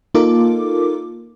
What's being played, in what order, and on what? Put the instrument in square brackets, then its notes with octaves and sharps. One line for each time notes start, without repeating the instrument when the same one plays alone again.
[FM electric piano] A#3 D#4 F4 A4 A#4 D6